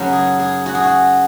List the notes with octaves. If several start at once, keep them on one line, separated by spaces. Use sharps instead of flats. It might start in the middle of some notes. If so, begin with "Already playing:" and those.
Already playing: F#2 C#3 F#3
G#4
G#4
F#4
G#4
F#4